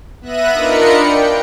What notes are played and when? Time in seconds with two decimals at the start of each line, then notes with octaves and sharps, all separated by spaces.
0.21 B3 E5 F#6 A#6 D#7
0.52 D4 D#4 F4 A#4 B5 C#7
0.98 G5